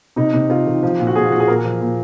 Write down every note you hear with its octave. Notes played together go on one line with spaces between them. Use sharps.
C3 D#4
C3
C3 F4
D#3
F3
A#2 F4
F#4
A#2 G#4
F4
A#2 F#4
G#4
A#2 A#4
F3
A#2